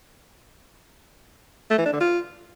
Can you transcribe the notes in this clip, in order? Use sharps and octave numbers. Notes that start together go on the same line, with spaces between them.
A3
E3
D4
D3
F4